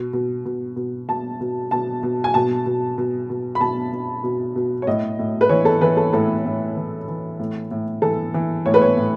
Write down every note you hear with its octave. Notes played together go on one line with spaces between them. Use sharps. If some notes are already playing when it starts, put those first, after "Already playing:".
Already playing: B2
B2
B2
B2
B2 A5
B2
B2 A5
B2
G#5
B2 A5
B2
B2
B2
B5
B2 A5
B2
B2
B2
C#5
A2 D#5
A2
B4
E3 C#5
A4
E3 B4
A4
A2 A4
A2
E3
E3
A2
A2
E3 A4
E3
A2 C#5
B4
C#5
A2